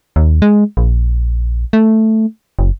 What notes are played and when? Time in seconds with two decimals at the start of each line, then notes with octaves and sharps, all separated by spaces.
0.16 D#2
0.42 G#3
0.77 A#1
1.73 A3
2.59 F#1